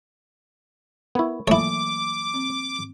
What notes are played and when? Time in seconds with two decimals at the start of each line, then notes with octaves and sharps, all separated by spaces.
1.15 B3 E4 A#4 B5 C#6
1.48 E3 F#3 A3 A#3 E4 C#5 D6
2.34 C4